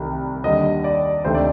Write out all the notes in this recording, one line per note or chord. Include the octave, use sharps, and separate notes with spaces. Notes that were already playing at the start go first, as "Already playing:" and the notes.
Already playing: C2 C3 D#3 A3
D#2 D3 G3 D#5
D5
D2 C3 D#3 A3 C5
D5